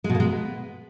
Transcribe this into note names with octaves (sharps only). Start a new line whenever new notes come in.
G#3
B2
A#3
G#3
B3